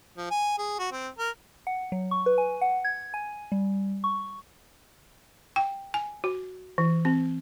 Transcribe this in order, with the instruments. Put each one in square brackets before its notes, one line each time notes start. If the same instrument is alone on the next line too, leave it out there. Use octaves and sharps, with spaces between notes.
[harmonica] F3
G#5
G#4
F#4
C4
A#4
[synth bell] F#5
F#3
C#6
B4
G#5
F#5
G#6
G#5
G3
C#6
[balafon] G5
G#5
F#4
E3
C4